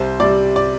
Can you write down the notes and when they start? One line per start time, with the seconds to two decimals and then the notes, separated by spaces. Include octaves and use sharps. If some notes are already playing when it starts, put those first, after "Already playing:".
Already playing: C2 C5
0.20 C3 G3 D5
0.56 D5